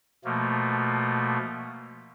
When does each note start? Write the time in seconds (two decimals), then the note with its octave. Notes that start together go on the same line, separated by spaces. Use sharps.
0.24 B2 F3 A3 A#3